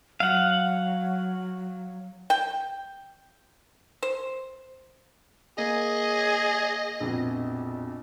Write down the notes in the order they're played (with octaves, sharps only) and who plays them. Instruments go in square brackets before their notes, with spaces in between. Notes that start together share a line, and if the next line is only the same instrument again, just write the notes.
[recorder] F#3 [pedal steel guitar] F5 F#5
[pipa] G5
C5
[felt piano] A#3 [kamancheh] G#4 [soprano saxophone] D#5
[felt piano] A#1 F2 B2